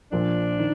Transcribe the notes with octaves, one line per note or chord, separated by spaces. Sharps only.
A#1 A#2 F3 D4
D#3